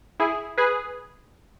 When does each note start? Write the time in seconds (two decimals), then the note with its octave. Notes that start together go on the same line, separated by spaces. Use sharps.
0.20 E4 G#4
0.58 G#4 B4